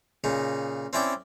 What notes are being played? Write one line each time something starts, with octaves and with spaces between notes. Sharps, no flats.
A#2 C#3 D#4
C4 C#4 E4 D5 G5